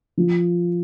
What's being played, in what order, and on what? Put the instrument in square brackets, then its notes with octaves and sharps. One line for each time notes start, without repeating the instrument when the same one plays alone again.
[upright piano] F3